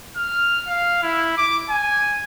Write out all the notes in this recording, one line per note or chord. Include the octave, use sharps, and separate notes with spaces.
F6
F5
E4
D6
G#5